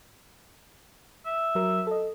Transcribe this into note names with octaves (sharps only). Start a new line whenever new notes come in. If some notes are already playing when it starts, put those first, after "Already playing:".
E5
F#3 A#4 E6
A4 D#5